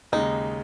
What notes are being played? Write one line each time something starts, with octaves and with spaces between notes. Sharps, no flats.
D#2 C#3 G#3 D#4